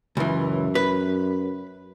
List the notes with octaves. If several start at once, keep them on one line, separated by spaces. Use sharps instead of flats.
C#2 F#2 E3
B4